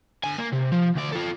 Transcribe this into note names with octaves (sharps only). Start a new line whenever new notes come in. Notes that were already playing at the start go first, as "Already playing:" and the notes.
D3 G#5
A#3
C3
F3
D2 D5
F4 A4